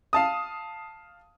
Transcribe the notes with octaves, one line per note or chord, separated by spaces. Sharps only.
F5 A5 D#6